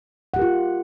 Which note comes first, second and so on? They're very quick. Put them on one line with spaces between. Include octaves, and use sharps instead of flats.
F#5 G4 A#4 F4